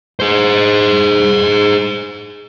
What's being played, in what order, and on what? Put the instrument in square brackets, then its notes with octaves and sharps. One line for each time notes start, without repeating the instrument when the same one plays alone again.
[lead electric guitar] G#4 C5